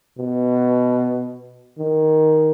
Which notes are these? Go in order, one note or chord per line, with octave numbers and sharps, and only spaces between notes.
B2
D#3